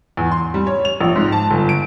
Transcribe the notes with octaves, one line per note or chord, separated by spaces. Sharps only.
E2
C6
G3
C#5
F7
A#1
G#2
A5
G1
D7